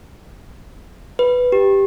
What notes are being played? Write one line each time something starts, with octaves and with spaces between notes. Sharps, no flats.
B4
G4